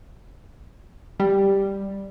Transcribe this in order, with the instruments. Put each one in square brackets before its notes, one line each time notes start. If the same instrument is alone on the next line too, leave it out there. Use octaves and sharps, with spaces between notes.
[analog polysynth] G3